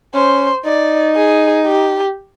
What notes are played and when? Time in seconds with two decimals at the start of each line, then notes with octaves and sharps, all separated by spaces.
0.14 C#4 C5
0.65 D#4 D5
1.16 G#4
1.67 G4